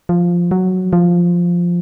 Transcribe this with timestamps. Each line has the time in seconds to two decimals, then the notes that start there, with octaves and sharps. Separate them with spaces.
0.09 F3
0.51 F#3
0.93 F3